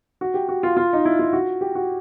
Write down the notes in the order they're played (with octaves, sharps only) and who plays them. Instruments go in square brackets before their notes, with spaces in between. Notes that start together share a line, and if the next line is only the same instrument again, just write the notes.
[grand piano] F#4
G4
F#4
F4
F4
D#4
E4
F4
F#4
G4
F#4